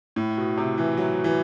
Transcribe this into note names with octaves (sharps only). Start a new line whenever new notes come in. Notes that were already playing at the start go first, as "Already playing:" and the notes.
A2
B2
C3
E3
F#3
E3